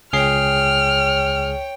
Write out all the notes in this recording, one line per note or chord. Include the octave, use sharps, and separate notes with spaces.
C#2 G#4 C#5 G5 F6 C7